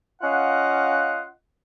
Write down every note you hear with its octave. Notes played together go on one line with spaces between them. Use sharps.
C#4 F4 D#5 F5 F#5